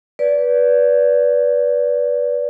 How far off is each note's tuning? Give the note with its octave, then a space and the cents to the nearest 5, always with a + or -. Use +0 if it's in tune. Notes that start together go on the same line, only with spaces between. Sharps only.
B4 -15 D5 -20